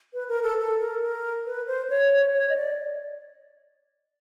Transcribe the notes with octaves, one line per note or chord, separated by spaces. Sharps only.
B4
A#4
A4
A4
A#4
A#4
B4
C5
C#5
C#5
D#5
D5